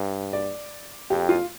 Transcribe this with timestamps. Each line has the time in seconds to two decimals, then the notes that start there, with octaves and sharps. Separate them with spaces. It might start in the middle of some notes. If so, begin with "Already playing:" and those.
Already playing: G2
0.33 D5
1.10 F2 G4
1.29 F4